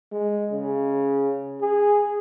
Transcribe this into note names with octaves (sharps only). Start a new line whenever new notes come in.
G#3
C#3
G#4